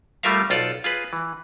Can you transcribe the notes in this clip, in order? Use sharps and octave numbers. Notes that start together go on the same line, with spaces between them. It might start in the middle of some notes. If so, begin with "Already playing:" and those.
G3 A3 F4 A#4 E5 F5
B1 F4 A4 D5
F4 G#4 B4
E3